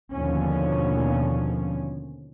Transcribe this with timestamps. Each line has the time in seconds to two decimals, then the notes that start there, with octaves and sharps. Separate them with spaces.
0.12 D#2 B2 D3 F3 C#4